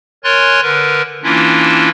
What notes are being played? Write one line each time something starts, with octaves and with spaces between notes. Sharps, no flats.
A#4 C#5 G#5 C6 F#6 A6
D3 A#4 B4
E3 A#3 C#4 D4 E4 F4